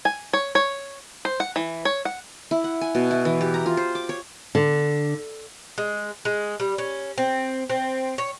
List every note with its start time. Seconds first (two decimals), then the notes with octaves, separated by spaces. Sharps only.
0.05 G#5
0.33 C#5
0.55 C#5
1.25 C5
1.40 F#5
1.56 E3
1.85 C#5
2.05 F#5
2.51 E4
2.64 F#5
2.81 G#5
2.95 B2
3.11 E4
3.25 E3
3.41 G4
3.54 A#5
3.66 F4
3.77 C5
3.95 D6
4.09 C#5
4.55 D3
5.78 G#3
6.25 G#3
6.60 G3
6.78 C#4
7.18 C4
7.70 C4
8.18 C#5